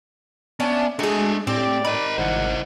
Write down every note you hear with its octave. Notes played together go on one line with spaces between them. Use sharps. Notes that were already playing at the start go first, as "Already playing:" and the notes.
B3 C#4 D4 E5 A5
G#3 A3 D4 F#4 G#4 D#5
A2 C4 G4 D5
D#4 A#4 B5
G#1 E4 C5 F#5